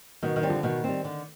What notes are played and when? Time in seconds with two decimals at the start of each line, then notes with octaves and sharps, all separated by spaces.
0.22 B2 D#3
0.36 D#3
0.43 G3 C4
0.49 D3 F3
0.63 B2 D#3
0.84 G3 C4
1.04 D3